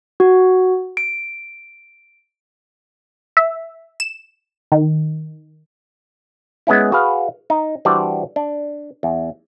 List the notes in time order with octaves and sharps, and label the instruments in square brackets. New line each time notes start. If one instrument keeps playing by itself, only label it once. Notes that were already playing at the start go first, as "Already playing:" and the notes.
[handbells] F#4
D7
[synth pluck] E5
E7
D#3
[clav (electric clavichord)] G#3 B3 C#4 E4
F#4 G#4 B4 F5
D#4
E3 G3 D4 F#4 C5 D5
D4
E2